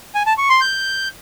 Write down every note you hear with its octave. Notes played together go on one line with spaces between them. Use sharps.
G#5
A5
C#6
C6
G6